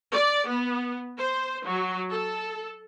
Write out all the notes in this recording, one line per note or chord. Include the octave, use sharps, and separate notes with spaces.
D5
B3
C5
F#3
A4